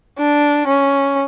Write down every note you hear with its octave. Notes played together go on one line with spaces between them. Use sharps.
D4
C#4